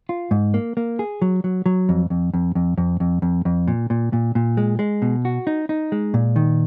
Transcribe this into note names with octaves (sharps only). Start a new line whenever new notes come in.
F4
G#2
A#3
A#3
G#4
F#3
F#3
F#3
F2
F2
F2
F2
F2
F2
F2
F2
A#2
A#2
A#2
A#2
G#3
G#3
B2
F#4
D#4
D#4
G#3
A#2
D#3